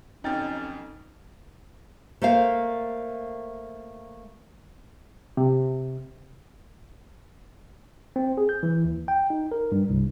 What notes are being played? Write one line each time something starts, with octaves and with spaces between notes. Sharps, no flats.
F1 F2 F#3 C#4 D#4 G5 A6
A3 A#3 C5 F5
C3
C4
G#4
G6
E3
D#2
G5
D#4
A#4
G2
C2